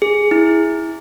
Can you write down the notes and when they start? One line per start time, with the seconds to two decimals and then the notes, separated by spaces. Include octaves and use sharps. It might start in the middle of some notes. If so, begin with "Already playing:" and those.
0.02 G#4
0.31 E4